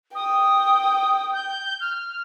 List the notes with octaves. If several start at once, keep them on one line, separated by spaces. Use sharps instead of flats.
G5 D#6
G6
F6